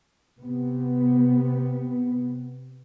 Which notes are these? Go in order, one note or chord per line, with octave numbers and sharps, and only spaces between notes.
C3 B3